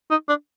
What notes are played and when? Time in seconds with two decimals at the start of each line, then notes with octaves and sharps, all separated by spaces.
0.11 D#4
0.28 D4